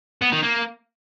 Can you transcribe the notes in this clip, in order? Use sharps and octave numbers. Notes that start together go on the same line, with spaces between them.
B3
D#3
A#3